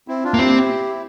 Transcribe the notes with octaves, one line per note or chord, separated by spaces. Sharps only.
C4 E4
D4 F4
A#3
C4 E4 G4